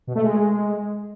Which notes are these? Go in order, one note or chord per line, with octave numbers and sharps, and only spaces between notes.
B2
A3
G#3